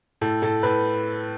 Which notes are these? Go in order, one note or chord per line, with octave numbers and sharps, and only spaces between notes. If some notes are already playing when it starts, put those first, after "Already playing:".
A2 A4
A2 A4
A2 B4